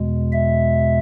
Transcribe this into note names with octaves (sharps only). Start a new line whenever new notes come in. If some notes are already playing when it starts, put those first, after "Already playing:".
Already playing: E2 B2 G#3
E5